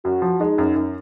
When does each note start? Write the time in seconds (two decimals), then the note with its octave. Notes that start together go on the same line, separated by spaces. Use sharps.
0.04 F#2 F#4
0.22 F3
0.40 G#3 D#4
0.58 F#2
0.76 F#2